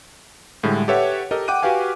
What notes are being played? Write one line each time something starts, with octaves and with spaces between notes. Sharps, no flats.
A2 D3 G3 G#3
G4 A4 B4 C#5 E5 F#5
G4 A4 A#4 D#5
F#5 G5 D6 F#6 D#7
F#4 G4 B4 F5 G#5